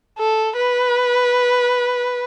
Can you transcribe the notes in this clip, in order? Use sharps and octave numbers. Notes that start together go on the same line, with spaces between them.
A4
B4